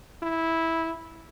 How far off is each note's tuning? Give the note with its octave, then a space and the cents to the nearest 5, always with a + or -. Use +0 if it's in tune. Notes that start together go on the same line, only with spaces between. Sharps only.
E4 -10